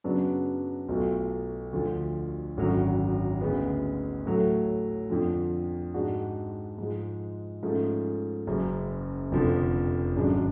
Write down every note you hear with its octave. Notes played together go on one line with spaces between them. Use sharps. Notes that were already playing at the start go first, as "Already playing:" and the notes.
F#2 C#3 F#3 B3 D4
B1 B2 A3 F4
D2 D3 F3
G#1 F#2 D3 F#3
D2 C#3 G#3 B3
A2 F#3 A3
F2 D3 F3
G#2 G#3 D4 F#4
G#2 F3 G#3
G#2 F3 A3 C#4
F#1 F#2 C#3
F1 F2 D3 F3
G#1 F#2 C#3 G#3 D4